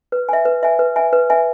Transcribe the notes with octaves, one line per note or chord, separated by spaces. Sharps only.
B4
E5 G#5
B4
E5 G#5
B4
E5 G#5
B4
E5 G#5